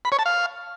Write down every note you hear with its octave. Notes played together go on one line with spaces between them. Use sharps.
B5
C#5
A5
F5